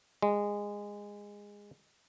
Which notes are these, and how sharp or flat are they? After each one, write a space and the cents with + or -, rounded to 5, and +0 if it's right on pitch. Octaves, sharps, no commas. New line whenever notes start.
G#3 -20